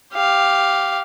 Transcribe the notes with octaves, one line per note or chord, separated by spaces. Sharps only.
G4 F5